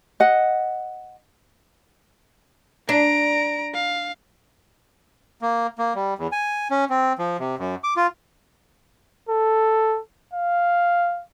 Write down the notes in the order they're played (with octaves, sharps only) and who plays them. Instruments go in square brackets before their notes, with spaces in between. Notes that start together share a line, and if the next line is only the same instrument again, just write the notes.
[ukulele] D#5 F#5
[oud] D4 [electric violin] A#5 D7
[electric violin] F5
[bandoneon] A#3
A#3
G3
E2
G#5
C#4
C4
F3
C3
F#2
D6
F4
[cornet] A4
F5